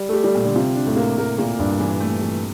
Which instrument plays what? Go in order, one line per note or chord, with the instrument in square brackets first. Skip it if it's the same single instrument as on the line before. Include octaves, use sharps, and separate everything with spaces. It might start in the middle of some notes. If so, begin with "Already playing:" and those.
Already playing: [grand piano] G3
A3
[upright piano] G4
[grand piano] G3
[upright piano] A#2
[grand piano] D3
[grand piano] C3 [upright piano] F4
[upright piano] D4
[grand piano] A2
[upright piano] A#3
[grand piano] A2 [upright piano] A#4
[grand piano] A#2 [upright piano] A#3
[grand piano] G2 [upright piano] D4
[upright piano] E3
A3
E3